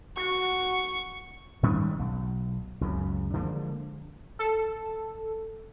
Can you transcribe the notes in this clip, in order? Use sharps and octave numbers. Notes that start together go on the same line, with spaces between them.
F#4 C#6
G#2 D#3 G3 C#4
B1
C#2 F#2 C#3
D3 F3 G#3 A#3
A4